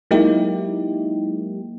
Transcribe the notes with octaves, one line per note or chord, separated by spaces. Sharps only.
F#3 G#3 A#3 D#4 E4 G4